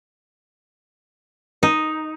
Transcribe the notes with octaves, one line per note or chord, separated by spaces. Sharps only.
D#4